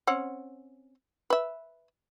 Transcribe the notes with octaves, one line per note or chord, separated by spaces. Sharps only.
C4 C#4 F#5
B4 E5